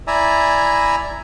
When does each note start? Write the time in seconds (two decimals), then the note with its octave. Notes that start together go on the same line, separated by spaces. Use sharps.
0.07 E4 D5 E5 G#5 A#5